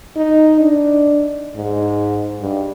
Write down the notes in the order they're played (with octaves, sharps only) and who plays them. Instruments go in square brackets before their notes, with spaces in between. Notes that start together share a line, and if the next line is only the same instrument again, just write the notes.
[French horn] D#4
D4
G#2
G2